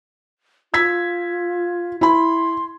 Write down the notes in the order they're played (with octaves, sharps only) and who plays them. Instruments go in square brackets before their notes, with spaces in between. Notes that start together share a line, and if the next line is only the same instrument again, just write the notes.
[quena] F4 [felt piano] E6 G#6 B6
[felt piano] E4 B5 [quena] C6